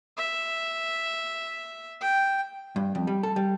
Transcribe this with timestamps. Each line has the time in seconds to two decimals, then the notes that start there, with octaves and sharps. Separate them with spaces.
0.17 E5
2.01 G5
2.76 G2
2.95 F2
3.07 G3
3.23 A4
3.36 G3